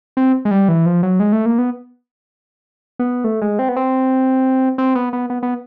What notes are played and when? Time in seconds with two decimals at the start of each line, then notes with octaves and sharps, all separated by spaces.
0.17 C4
0.45 G#3
0.51 G3
0.68 E3
0.86 F3
1.03 F#3
1.20 G#3
1.33 A3
1.46 A#3
1.58 B3
2.99 B3
3.24 A3
3.42 G#3
3.59 C4
3.69 B3
3.76 C4
4.78 C4
4.95 B3
5.13 B3
5.30 B3
5.43 B3